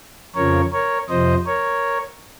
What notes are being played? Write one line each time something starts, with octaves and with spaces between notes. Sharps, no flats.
F2 C#3 F3 A#4 C#5
A#4 C#5
F2 C3 F3 C5 D#5
A#4 C#5